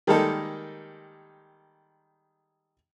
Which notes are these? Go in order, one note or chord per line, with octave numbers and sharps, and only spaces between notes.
D#3 G3 G#3 A#3 D#4 A4